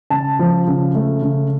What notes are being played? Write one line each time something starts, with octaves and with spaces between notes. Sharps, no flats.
C#3 A5
F3
C#3
A3
C#3